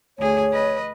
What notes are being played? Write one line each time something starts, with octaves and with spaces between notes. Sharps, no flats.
D2 G#4 C#5
B4 D#5